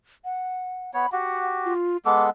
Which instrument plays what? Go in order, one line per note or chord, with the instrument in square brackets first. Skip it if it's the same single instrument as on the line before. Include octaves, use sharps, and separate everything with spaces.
[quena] F#5
[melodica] B3 C#5 [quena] B5
[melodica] F#4 G4 [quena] F#5
[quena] F4
[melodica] G#3 B3 A4 [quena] D6